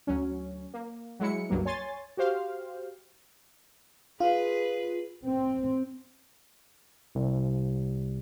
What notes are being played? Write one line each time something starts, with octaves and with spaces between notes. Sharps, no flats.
D2 F#3 C#4
A#3
F#3 G#3 E4 C#7
C#2 G2 F#3 A#3
C#5 G#5 C6 A6
F#4 G4 C5 F5
F4 G#4 B4
C4
C2